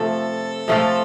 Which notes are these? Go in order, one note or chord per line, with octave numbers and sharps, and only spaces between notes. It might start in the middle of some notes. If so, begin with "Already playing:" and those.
Already playing: C3 F3 A3 F4 A4
C3 F3 A3 F4